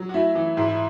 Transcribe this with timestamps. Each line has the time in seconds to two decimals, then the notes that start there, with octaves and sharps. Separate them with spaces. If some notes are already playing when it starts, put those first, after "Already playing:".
Already playing: F#3
0.09 F#4
0.14 A3 E4
0.35 E3
0.57 G#2 E4
0.69 E4